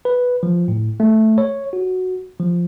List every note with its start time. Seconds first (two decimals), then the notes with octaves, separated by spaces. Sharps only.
0.05 B4
0.43 F3
0.68 A2
1.00 A3
1.38 C#5
1.73 F#4
2.39 F3